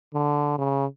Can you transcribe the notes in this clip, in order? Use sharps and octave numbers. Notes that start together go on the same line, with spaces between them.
D3
C#3